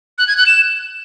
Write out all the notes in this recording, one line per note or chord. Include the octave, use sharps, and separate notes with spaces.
F#6
G#6
F#6
E7